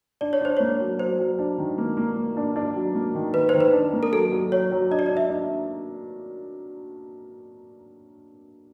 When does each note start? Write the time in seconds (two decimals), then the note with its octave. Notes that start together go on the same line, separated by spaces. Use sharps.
0.21 D4 D5
0.33 C#5
0.41 D4 C5
0.57 A#3 C#5
0.80 F#3
0.99 F#3 C5
1.19 F#3
1.39 D4
1.58 D#3
1.78 A#3
1.97 A#3
2.17 A#3
2.37 D4
2.56 D4
2.76 F#3
2.95 A#3
3.15 D#3
3.34 D#3 B4
3.49 C5
3.54 D#3
3.60 B4
3.73 D4
3.93 A#3
4.03 A#4
4.12 F#3 A4
4.32 F#3
4.52 F#3 C#5
4.72 F#3
4.91 D4 D#5
4.99 D5
5.06 D#5
5.11 D4
5.17 E5
5.30 D4